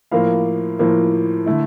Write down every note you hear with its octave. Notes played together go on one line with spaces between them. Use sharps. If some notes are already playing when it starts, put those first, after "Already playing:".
A2 F3 A#3 F5
A2 F3 A#3
D3 A3 E4